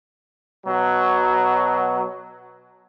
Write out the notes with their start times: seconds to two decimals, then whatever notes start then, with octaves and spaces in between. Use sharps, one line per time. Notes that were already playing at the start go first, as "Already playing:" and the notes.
0.66 B2 F#3